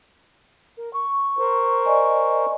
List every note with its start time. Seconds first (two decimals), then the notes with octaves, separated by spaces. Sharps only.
0.77 A#4
0.93 C#6
1.38 A#4 C5
1.85 D5 D#5 G#5